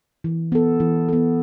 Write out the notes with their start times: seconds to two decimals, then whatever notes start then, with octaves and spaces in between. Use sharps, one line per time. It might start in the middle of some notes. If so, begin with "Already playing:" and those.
0.24 E3
0.52 B3 A4
0.80 E3
1.09 B3 A4